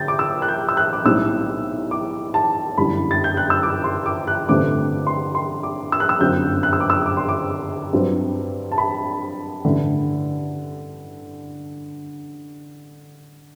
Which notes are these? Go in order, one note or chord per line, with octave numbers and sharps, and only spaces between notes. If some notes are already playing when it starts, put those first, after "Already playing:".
Already playing: D3 G6 A6
D6
E6
F#6
G6
E6
F#6
D6
B1 A2 G3 C4 E6
D6
A5
G1 F#2 E3 G3 B5
A6
G6
F#6
E6
D6
C6
D6
F#6
A1 G2 D3 A3 C4 D6
C6
C6
D6
E6
F#6
E6
G1 F#2 F#3 C4 G6
F#6
E6
D6
E6
D6
C6
D6
G2 F#3 C4
A5
B5
A1 G2 D3 A3